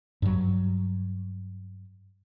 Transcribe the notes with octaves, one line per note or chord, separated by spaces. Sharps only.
G2 F#3